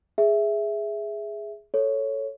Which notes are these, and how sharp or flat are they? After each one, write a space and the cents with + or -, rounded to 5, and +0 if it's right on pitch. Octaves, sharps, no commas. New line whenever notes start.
G#4 +0 E5 +0
A4 +0 C#5 +0